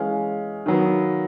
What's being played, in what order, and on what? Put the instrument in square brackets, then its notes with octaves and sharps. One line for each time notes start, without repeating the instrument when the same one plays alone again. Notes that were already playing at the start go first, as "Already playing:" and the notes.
Already playing: [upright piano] E3 G#3 C#4 F5
D#3 F#3 B3